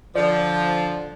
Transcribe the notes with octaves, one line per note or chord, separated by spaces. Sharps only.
D3 F3 D5